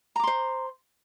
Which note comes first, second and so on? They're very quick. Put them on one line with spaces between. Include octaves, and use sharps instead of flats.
A#5 D6 C6 C5